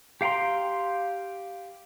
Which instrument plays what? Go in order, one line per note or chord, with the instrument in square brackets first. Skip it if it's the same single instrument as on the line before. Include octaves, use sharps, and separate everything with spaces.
[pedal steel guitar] G4 F5 G5 A#5 C6